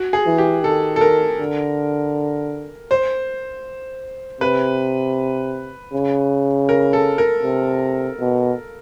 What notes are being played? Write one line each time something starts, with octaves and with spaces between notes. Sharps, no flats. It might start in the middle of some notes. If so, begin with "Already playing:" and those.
Already playing: F#4
G#4
E3
G4
D#3 A4
A4
A#4
D3
C5
C3 B4
C#3
A#4
A4
A#4
C3
B2